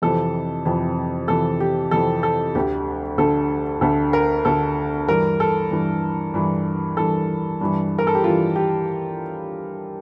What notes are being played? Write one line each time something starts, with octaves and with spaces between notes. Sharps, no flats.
F2 C3 E3 A4
F2 C3 E3
F2 C3 E3 A4
G4
F2 C3 E3 A4
A4
D2 D3 G4
D2 D3 A4
D2 D3 A4
A#4
D2 D3 A4
G2 E3 A#4
A4
G2 E3
G2 E3
G2 E3 A4
G2 E3
A#4
A4
G4
G2 E3 F4
G4